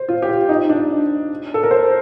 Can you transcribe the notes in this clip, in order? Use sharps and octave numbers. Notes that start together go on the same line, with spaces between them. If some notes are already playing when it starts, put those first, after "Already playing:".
Already playing: C5
F4
G4
F4
D#4
D4
A4
A#4
C5